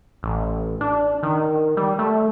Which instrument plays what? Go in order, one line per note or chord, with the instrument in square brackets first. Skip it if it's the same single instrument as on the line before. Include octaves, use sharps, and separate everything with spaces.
[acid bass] A1
D4
D#3
G3
A3